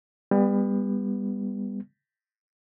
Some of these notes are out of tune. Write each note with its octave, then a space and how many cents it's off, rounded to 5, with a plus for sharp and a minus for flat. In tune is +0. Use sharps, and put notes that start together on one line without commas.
G3 +30 B3 +0